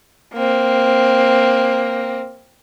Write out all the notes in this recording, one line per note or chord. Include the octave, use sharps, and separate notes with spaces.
A#3 C4